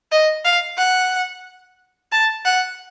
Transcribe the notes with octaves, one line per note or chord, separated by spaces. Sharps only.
D#5
F5
F#5
A5
F#5